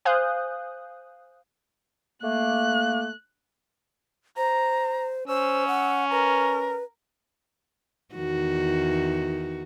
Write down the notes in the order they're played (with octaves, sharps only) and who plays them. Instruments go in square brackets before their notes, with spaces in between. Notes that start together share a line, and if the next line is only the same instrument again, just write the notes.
[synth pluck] C5 F5 G#5 D#6 F#6 G6
[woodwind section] A3 A#3 [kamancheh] F#6
[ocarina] C5 [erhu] A#5
[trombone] C#4 [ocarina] C5 [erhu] E6
[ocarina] F#5
[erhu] A#4 [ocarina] B4
[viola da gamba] E2 D#3 F#4